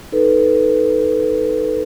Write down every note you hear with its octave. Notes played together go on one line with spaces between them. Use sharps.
D#4 A4 B4